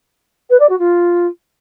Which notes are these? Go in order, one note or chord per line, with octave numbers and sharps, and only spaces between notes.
B4
D5
F#4
F4